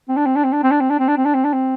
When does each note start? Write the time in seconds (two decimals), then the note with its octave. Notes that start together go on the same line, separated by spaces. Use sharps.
0.08 C4
0.17 D4
0.26 C4
0.36 D4
0.44 C4
0.53 D4
0.63 C4
0.71 D4
0.81 C4
0.90 D4
0.99 C4
1.08 D4
1.17 C4
1.25 D4
1.34 C4
1.44 D4
1.53 C4